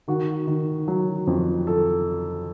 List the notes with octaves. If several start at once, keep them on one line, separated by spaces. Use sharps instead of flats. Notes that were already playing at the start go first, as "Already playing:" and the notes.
D#3 F#4
D#3
F#3
F2
A4